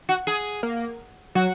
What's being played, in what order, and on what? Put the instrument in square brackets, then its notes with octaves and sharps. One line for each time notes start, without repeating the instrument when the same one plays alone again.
[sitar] F#4
G#4
[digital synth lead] A#3
[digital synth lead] F#3 [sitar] F#4